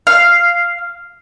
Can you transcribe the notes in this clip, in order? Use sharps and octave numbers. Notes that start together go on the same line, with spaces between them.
F5